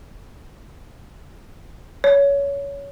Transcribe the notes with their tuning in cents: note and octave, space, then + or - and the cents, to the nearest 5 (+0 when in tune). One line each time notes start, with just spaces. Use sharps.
C#5 +20